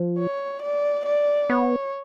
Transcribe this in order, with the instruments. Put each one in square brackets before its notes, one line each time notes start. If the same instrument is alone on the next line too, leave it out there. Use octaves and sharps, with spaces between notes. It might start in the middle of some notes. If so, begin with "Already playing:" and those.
Already playing: [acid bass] F3
[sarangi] C#5
D5
D5
[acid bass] B3 [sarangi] C#5